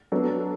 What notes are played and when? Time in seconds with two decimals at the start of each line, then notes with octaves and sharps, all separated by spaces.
0.12 F#3 B3 D4 A4